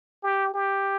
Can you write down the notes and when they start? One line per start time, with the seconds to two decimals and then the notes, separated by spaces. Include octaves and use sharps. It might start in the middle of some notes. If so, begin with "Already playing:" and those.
0.23 G4
0.54 G4